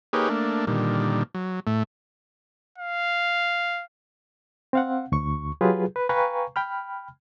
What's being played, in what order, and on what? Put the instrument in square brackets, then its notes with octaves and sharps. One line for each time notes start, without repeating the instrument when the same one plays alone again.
[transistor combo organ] A#3 D#4 G4 G#4 B4 C#5
A3 A#3 D4
A#2 D3 D#3 G3
F#3
A2 A3
[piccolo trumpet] F5
[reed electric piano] C4 F5 F#5
D2 C#6
F#3 F4 G4 G#4 B4
B4
B4 F5 G5 G#5 A#5 C#6
G5 B5 F6